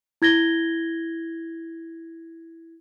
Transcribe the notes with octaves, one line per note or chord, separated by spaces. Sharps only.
E4 G#6 A#6 G7